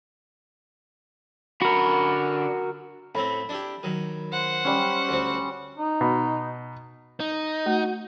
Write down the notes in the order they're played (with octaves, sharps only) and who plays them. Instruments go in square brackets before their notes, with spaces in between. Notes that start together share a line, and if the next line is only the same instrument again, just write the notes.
[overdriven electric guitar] D3 B5 [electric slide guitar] F#4 A#4
[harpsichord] A2 A3 C4 [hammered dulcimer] B5
[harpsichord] D4 E4 G4
D#3 F#3
[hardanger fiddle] C5 F#5
[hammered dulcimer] G3 C#4
[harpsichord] D2 C4
[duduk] D#4
[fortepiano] B2
[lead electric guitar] D#4
[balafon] A3 [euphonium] F#4